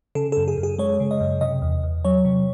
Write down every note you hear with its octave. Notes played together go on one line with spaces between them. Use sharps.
C#3 A4
F#2 A4
G#4
F#2
G#4
G#3 C#5
C#3
D#5
F#2
C3 D#5
E2
E2
F#3 C#5
C3